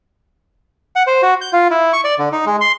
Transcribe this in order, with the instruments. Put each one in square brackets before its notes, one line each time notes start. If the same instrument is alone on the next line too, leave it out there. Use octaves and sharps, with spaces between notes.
[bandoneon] F#5
C5
F#4
G6
F4
E4
C#6
D5
D3
D#4
G#3
C6